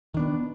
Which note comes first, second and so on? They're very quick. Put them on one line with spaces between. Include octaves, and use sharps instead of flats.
D#3 D4 B3